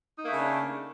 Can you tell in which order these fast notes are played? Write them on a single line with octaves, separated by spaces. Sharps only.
D#4 A#3 A3 C#3 D4